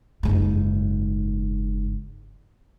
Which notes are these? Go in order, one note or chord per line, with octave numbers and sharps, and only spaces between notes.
F#1 G#2